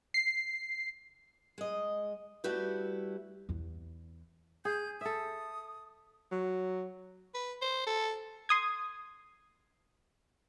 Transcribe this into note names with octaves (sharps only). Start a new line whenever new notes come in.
C7
G#3 D#5
G3 A3 E4 F#4 G4 B4
E2 E4
G#4 G6
A4 E5 D#6
F#3
B4
C5
A4
C6 D#6 G#6